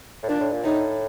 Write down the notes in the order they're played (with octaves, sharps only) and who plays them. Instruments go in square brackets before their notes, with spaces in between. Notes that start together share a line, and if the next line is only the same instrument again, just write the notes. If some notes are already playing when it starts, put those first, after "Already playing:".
[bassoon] A2
[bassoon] A#2 [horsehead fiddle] D4
[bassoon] A2
A#2
[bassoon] A2 [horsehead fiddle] D#4